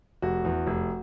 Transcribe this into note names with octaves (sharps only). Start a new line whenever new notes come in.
F1 F#4
E2
F1